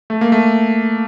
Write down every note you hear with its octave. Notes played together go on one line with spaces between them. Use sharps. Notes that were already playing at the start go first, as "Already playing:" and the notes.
A3
A#3
A3